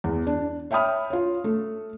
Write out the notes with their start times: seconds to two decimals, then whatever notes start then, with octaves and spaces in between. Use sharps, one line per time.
0.04 E2
0.27 D4
0.71 C#5 E5 G5 B5 D#6 F6
1.10 F4 C#5
1.44 A3 A4